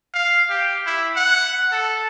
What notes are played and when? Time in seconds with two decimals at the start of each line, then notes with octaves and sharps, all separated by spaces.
0.14 F5
0.50 G4
0.86 E4
1.16 F#5
1.72 A4